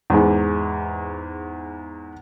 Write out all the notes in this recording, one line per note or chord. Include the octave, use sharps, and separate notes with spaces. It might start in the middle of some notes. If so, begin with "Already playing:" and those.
E2 G#2 G#4